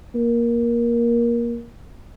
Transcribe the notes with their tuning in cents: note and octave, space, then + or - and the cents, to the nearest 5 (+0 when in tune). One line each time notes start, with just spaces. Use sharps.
A#3 +15